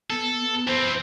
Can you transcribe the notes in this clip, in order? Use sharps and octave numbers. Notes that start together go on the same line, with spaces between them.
B3 A4
B3
E3 C4 C5